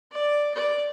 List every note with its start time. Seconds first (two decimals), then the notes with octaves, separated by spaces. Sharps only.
0.12 D5
0.54 D5